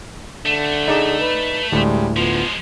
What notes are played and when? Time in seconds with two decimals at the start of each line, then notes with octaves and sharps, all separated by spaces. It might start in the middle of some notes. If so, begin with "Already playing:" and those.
0.46 D3 A3
0.88 D#4 G#4 D5
1.20 B4
1.72 D2 A2 G3 G#3
2.16 F3 G#3 B3 F4